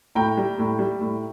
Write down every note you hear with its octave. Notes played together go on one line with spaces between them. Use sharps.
A2 G5 A#5
G3
A2
G3
A2